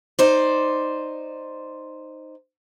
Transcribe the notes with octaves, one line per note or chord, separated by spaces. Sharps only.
D#4 C5 D5